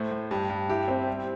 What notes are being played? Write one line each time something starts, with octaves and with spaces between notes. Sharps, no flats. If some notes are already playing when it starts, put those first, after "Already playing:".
Already playing: A2 A3 C5
A2
G2 G4
G2
E4 G4
C4 G4
G3